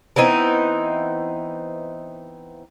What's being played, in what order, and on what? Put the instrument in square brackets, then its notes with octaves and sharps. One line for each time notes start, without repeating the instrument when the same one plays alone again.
[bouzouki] E3 B3 C4 D#4